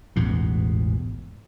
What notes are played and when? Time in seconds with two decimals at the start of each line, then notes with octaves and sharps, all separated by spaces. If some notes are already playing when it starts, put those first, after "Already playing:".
0.16 A1 E2 G#2 B2